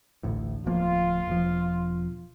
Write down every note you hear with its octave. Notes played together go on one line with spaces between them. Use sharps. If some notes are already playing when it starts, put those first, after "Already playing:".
A1 D2 A2
D1 F3 A#3 F4
E1 F3